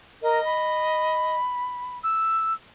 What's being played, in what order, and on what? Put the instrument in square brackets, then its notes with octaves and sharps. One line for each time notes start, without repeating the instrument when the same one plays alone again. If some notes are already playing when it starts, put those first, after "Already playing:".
[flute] A#4 [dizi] D#5
[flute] B5
[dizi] E6